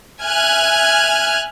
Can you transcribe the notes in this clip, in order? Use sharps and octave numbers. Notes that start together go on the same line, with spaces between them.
E5 G#5 F6 F#6 G#6